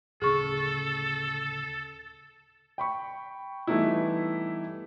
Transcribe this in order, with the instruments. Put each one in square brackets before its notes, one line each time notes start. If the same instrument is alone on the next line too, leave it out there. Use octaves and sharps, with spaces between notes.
[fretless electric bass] D1 C#3 [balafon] G#4 C#6 [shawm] A4
[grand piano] G5 B5 C#6
E3 G3 A3 B3 D#4 E4